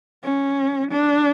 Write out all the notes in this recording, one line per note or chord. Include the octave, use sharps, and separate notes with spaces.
C#4
D4